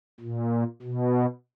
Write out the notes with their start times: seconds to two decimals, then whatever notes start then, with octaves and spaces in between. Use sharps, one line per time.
0.20 A#2
0.82 B2